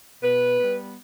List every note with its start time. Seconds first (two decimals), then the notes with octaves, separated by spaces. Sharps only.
0.23 B2 B4
0.60 G3 B3